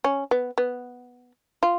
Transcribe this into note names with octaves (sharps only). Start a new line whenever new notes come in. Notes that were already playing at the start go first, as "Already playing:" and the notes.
C#4
B3
B3
F4